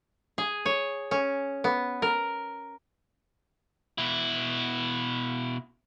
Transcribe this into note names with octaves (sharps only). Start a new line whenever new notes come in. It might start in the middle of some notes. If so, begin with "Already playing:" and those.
G#4
C#5
C#4
B3
A#4
B2 E4